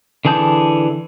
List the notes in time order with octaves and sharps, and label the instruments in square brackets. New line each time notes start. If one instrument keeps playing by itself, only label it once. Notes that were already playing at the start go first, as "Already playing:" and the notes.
[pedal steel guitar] D3 E3 G#4 A5 G6